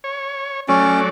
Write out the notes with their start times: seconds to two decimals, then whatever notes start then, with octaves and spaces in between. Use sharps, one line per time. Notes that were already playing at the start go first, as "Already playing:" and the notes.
0.04 C#5
0.68 F#3 A3 C#4 D5